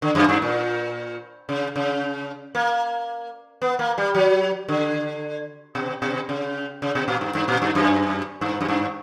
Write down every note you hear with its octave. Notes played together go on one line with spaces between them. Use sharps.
D3
F#2
G2
A#2
C#3
C#3
A#3
B3
A#3
G3
F#3
D3
B2
B2
C#3
C#3
B2
A#2
G2
G2
A#2
G2
F#2
G2
F#2
G2